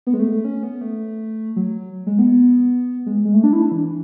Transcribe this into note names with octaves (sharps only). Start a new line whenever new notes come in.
B3
G#3
A3
A3
C#4
B3
A3
F#3
G#3
B3
G#3
G#3
A3
D4
E4
D4
E3